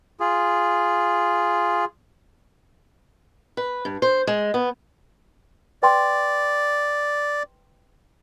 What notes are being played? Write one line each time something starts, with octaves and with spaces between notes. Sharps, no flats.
F4 G#4
B4
G2
C5
G#3
B3
B4 D5 G5 C6